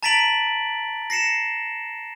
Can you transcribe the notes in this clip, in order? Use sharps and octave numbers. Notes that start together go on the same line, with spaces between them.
A5 A#5 A6 B6 D7 F#7
A#6 C7 C#7 E7